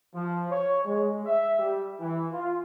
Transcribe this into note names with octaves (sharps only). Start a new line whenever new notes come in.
F3
C#5
G#3
E5
G3
E3
F4